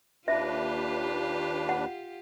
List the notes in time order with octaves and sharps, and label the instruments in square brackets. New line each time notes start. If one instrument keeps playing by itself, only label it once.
[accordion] D#2 D4 B4 [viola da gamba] F4 G4 [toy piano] E5
[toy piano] F#5